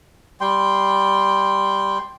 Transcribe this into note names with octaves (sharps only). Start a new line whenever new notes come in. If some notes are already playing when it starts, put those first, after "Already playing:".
G3 G5 C6